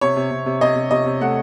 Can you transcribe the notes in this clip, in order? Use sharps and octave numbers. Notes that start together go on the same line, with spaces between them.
C3 C#5
C3
C3
C3
C3 D#5
C3
C3 D#5
C3
A3 F#5